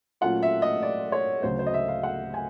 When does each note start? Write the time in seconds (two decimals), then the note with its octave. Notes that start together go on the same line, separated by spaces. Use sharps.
0.21 A#2 F#3 A3 C#4 F4 F#5
0.43 E5
0.62 D#5
0.83 D5
1.12 C#5
1.43 D2 C#3 F#3 C5
1.59 C5
1.67 D#5
1.74 E5
1.88 F5
2.03 F#5
2.34 G#5